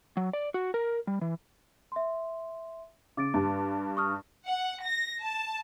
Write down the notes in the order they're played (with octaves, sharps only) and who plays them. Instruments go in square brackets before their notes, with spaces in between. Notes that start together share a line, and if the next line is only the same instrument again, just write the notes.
[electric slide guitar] F#3
D5
F#4
A#4
G3
E3
[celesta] E5 C6
[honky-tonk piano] C#3 [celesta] D6 A6 D7
[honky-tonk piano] G2
[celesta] C#6 D#6 F6
[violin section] F#5
A#6
A5